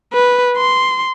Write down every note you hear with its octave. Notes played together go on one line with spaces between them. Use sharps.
B4
C6